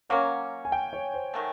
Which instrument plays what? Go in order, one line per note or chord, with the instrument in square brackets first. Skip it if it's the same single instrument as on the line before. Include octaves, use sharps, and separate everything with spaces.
[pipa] F#3 A#3 C#4 [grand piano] F#5
[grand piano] G#5
G5
C#5
C5
[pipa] D#3 F#3 A3